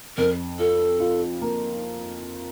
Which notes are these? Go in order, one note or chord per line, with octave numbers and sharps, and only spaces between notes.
F2 A#4
F4 A4
F4
A#3